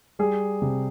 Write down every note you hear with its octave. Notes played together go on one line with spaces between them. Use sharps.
G3 G#4
C3